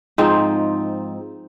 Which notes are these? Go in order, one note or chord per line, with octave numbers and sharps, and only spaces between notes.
G#2 F3 C4 D#4